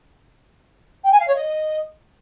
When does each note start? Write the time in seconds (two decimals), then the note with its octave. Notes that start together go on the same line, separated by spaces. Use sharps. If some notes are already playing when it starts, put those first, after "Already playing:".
1.04 G5
1.11 G#5
1.19 F5
1.27 C#5
1.35 D#5